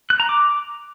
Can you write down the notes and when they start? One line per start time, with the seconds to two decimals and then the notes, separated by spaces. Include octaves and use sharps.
0.10 F#6
0.20 A#5
0.29 D6